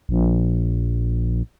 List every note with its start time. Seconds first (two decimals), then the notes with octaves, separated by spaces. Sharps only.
0.09 A#1